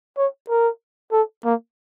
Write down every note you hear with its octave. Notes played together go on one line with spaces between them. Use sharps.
C#5
A#4
A4
A#3